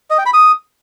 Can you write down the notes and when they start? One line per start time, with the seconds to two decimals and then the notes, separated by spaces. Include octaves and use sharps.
0.10 D#5
0.18 G5
0.26 B5
0.34 D#6